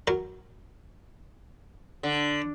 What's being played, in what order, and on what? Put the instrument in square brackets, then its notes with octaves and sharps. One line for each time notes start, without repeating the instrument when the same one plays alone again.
[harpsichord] F#3 A#4
[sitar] D3